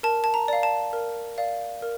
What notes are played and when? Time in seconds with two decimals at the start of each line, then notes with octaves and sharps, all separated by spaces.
0.03 A#4 A5
0.24 A5
0.34 A#5
0.48 D5 F5
0.63 A5
0.93 A#4
1.38 D5 F5
1.82 A#4